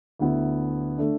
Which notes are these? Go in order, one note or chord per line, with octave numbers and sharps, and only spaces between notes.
D2 D3 B3 E4 B4
D3 A3 D4